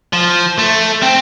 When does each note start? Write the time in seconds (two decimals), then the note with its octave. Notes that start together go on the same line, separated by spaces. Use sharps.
0.13 F3
0.59 A3
1.02 C4